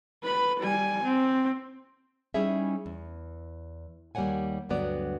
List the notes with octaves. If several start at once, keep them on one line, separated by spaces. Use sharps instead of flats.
B4 B5
G3 G#5
C4
G3 C#4 D#4 E4 G#4 E5
E2
D#2 G3 A#3 C#5 F#5 G#5
D2 G2 F#3 B3 D5